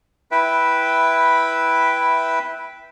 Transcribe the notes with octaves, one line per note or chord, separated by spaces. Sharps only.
E4 B4 E5 G5